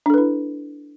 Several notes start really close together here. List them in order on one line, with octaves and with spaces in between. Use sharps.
D4 A4 B4 E4